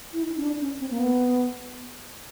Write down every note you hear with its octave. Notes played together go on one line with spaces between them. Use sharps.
E4
D#4
C#4
D4
C#4
C4
A#3
B3